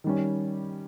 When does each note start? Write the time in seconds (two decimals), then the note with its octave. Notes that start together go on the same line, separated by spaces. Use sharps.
0.04 D#3 G3 C#4